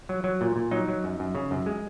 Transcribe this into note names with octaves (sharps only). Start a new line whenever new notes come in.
F#3
F#3
A#2
A#2
F#3 D#4
F#3
F#2
F#2
C#3
F#2
G#3